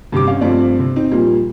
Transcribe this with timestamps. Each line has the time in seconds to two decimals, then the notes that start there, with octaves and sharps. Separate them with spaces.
0.12 G2 C3 G4 D6
0.27 C#4 F5
0.41 G2 F3 A3 C4 D5
0.79 C3
0.96 C4 D#4
1.11 A#2 F3 G3 A#3